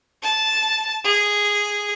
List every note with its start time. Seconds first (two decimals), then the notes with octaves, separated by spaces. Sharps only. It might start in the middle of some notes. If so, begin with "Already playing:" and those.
0.22 A5
1.04 G#4